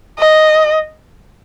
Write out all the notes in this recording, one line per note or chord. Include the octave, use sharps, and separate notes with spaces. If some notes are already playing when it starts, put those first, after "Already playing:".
D#5